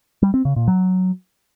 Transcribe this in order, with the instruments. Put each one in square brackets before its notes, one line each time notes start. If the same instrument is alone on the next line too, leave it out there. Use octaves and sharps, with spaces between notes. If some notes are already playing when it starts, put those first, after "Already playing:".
[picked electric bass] G3
C4
C#3
A#2
F#3